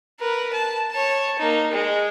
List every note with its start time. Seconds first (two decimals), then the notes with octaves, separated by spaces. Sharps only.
0.20 A#4 B4
0.53 A5
0.91 C#5 A5
1.38 A#3 D#4
1.71 G#3